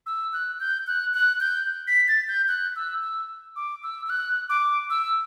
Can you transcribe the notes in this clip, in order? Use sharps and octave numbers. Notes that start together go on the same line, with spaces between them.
E6
F#6
G6
F#6
F#6
G6
B6
A6
G6
F#6
E6
E6
D6
E6
E6
F#6
D6
E6